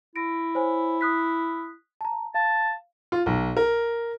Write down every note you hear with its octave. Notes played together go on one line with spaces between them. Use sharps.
E4 A#6 D7
C5 C#5 G#5
D#6 F#6 B6
A5 A#5
F5 A5
F4
B1
A#4